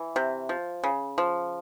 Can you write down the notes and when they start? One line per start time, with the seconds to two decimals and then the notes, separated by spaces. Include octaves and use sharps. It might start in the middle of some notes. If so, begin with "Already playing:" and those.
Already playing: E3
0.16 C3
0.49 F3
0.84 C#3
1.18 F3